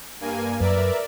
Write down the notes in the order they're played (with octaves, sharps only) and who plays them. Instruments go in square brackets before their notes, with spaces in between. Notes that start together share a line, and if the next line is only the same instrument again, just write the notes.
[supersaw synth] G2 A#3 G#5
[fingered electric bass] F#2 [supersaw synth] A#4 D5 E5 [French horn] B4